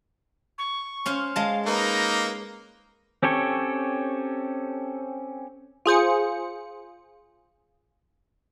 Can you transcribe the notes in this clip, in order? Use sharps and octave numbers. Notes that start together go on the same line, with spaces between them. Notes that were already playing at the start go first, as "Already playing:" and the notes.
C#6
C#4 C5 F5
G#3 F5 A5
A#3 D#4 B4
C4 C#4 G4 A4 C#5
F4 G#4 C5 C#7